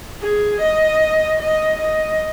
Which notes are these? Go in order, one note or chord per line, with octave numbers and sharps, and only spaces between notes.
G#4
D#5
D#5
D#5